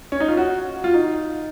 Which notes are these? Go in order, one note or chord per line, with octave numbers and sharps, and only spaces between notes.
C#4
D#4
F4
F#4
F4
D#4